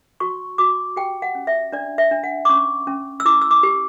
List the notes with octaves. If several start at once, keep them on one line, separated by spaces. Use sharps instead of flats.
F#4 C#6
F#4 D6
G4 G5
F#5
C#4
E5
D4 D5
E5
D4
F#5
D6
C#4 C#6
C#4
E6
E4 D6
E6
D6
G4